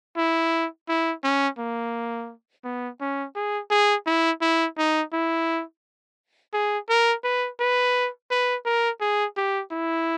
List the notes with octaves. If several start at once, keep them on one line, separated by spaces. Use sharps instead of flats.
E4
E4
C#4
A#3
B3
C#4
G#4
G#4
E4
E4
D#4
E4
G#4
A#4
B4
B4
B4
A#4
G#4
G4
E4